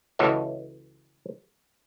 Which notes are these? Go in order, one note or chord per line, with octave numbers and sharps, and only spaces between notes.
C#2 E3 F#4 A4 C#5 D#5